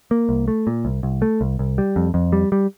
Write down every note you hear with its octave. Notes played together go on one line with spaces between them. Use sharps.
A#3
C2
A3
A#2
C2
C2
A3
C2
C2
G3
F2
F2
G3
G3